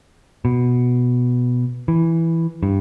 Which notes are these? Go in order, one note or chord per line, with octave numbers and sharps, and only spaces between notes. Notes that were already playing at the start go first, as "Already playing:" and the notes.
B2
E3
G2